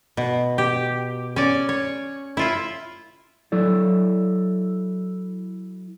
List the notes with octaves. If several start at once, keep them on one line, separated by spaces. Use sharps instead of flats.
B2
G4
C#4 D5
C#5
E4 F4 E5
F#3 E4 A4 D5